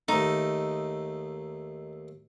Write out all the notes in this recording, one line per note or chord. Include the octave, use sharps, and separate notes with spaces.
D#2 A3 D#4